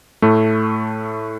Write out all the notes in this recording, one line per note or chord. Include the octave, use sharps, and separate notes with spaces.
A2 A3